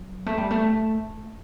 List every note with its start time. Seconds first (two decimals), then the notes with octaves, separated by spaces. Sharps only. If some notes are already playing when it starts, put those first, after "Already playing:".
Already playing: F#3
0.26 A3
0.38 G3
0.51 A3